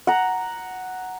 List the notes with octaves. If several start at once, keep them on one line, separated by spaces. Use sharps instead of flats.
F#5 A#5